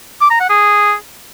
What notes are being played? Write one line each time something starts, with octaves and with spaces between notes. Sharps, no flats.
D6
A#5
F#5
G#4